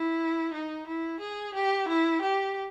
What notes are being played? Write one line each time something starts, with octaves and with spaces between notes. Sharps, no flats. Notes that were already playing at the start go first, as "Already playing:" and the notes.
Already playing: E4
D#4
E4
G#4
G4
E4
G4